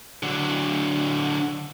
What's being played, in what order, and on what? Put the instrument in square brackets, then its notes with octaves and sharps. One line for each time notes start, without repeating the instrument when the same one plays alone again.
[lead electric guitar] D3 F#3